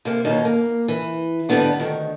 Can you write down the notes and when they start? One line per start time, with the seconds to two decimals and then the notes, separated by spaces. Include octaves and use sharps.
0.05 C3 A#3
0.25 D#2 B2 C#4 D#4
0.45 A#3
0.88 E3
1.49 G#2 B2 D3 G3 B3 D4
1.80 D2 D#3